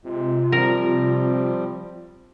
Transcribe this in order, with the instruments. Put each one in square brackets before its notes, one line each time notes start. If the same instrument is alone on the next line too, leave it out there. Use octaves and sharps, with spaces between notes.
[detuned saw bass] C3 [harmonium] G#3 [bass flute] F4
[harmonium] F3 G3 C4 [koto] A#4